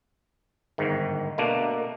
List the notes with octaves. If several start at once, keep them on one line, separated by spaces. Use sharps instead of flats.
G1 G#2 D#3
B2 A3 A#3 D4